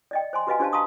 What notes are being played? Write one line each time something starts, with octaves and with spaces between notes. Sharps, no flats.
D5 D#5 G5
C5 G#5 C6
F#4 G4 B4 D#5 F5 G#5
D4 G4 C5 F5 A5
F5 A5 A#5 C6 C#6 D#6